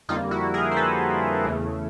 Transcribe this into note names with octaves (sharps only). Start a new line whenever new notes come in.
F2 D3 G3 A#3 D#4 F4
E4 F#4
G#4 A#4
C5
A4 B4
E2 C#3 E3 A3